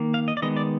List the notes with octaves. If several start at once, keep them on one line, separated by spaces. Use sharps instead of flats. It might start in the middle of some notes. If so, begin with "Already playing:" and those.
Already playing: D#3 A#3
F5
D#5
D5
D#3 G#3 B3 D#5
D5